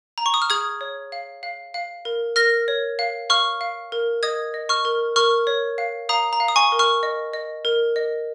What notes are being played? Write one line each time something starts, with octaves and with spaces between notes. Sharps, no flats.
A#5
C#6
D#6
F6
G#4 D#6 G#6
C#5
F5
F5
F5
A#4
A#4 F6 A#6
C#5
F5
F5 C#6 F6
F5
A#4
D#5 D#6 G#6
D#5
C#6 F6
A#4
A#4 C#6 F6
C#5
F5
F5 A#5 D#6
A#5
F5
D#6
G#5 C#6
A#4
C#6 F6
D#5
D#5
A#4
D#5